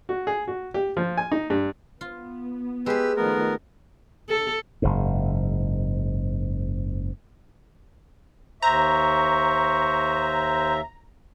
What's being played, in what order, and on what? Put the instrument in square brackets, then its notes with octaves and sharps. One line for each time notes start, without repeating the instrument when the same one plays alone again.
[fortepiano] F#4
G#4
F#4
G4
F3
G#5
D#4
G2
[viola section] B3 [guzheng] F4
[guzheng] G#3 G#4 [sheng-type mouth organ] G4 B4 E6
[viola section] D#3 F3 A3 [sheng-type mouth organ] B3 A#4
[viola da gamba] A4
[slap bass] F#1 G#2
[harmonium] D#2 E5 [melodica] C5 [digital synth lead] A#5 [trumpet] C#6